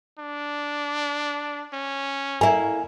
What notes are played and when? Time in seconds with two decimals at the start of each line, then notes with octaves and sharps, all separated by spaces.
0.19 D4
1.73 C#4
2.41 A#3 E4 G#5